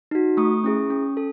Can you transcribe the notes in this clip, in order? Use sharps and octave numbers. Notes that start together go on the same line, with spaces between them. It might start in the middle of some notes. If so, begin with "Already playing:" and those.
D#4 F#4
A3 C#6 D#6
C#4 E4 G#4
C#4
A4